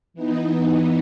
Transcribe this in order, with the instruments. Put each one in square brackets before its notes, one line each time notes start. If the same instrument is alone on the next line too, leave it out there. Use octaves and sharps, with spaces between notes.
[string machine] E3 B3 D#4